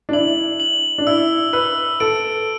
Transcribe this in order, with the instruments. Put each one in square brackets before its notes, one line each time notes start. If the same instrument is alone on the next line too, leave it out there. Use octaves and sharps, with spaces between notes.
[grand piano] D4
[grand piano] E4 [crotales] F#7
[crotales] F#7
[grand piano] D4
[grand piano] E4 [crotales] E6
[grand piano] B4 [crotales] E6
[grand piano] A4 [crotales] D7